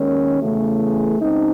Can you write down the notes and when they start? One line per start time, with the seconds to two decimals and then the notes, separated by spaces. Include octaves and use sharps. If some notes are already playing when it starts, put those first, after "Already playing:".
Already playing: D#2 D#3 G#3 C#4
0.41 E2 C#3 E3 A3 F#4
0.81 G#4
1.19 C#3 G#3 C4 D#4